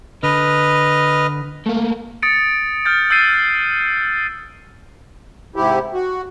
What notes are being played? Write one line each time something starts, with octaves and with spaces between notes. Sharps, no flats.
D3 B4 D#5 F6
A3 A#3
D#6 A6 C#7 D7
F6 G6 A6
E6 F6 G6 A6 C7 D#7
G#2 C3 E4 G4
F#4